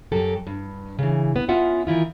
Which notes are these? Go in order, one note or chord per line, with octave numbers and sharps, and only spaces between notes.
F#2 F#3 G4 A4
G2
C#3 E3
B3
B3 C#4 F4 E5 F#5
D#3 E3 E4 F4